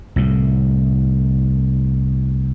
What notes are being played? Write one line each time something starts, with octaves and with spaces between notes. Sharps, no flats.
C2 A2